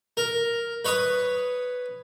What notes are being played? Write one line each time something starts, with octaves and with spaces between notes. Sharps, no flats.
A#4
B4 C#5 C#6 D#6